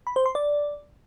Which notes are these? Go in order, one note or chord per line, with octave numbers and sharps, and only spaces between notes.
B5
C5
C6
D5